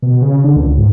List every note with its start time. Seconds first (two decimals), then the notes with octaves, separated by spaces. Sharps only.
0.02 B2
0.21 C#3
0.44 D3
0.56 C#2
0.77 G#2